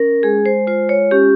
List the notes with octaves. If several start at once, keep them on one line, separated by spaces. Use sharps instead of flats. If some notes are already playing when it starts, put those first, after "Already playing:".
Already playing: C#4 A#4
G#3 G#4
C5
F4 C5
C#5
C#4 G4